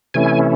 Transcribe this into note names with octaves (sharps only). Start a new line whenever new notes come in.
C3 E3 A3 C#4 E4 G#5